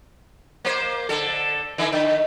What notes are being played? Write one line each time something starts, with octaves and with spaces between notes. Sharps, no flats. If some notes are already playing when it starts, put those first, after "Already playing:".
A#3 C5
D3 A4
D3 D#3
D3